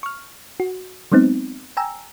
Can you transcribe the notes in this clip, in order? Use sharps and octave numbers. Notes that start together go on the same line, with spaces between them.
C#6 F6
F#4
F#3 G#3 B3 C4 D#4
G5 G#5 A#5 E6